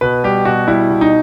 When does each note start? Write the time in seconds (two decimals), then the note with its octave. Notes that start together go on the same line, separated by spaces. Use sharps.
0.01 B2 B4
0.24 G3 G4
0.45 B2 F#4
0.67 G3 E4
0.90 B2
1.01 D#4